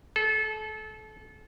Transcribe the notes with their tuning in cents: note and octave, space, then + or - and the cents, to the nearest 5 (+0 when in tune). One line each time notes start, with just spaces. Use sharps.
A4 -30